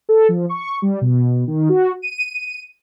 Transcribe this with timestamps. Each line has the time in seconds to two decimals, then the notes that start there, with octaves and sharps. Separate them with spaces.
0.09 A4
0.29 F3
0.49 C#6
0.82 G3
1.01 B2
1.47 D#3
1.69 F#4
2.02 D#7